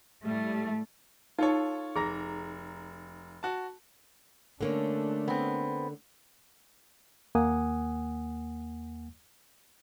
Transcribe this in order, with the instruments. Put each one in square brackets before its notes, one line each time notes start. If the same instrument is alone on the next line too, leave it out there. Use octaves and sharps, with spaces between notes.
[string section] A2 G3 [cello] A3
[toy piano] D#4 [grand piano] F4 A4 C#5
[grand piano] F1 A#5 A#6 [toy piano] G#4
[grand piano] F#4 A5
[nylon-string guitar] D3 A#3 C#4 [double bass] A3 D4
[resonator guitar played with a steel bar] B3 C4
[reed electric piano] D#2 A#3 F#5 G#5 D#6